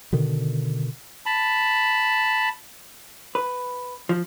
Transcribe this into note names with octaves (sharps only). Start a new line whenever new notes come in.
B2 D3 D#3
A5 B5
B4
F3